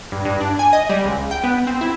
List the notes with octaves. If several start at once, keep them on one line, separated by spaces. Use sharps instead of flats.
G2
G2
D4
G#5
D#5
G3
C#2
G5
B3
C4
E4